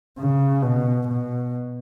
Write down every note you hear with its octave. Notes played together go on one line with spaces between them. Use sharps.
C#3
B2
B2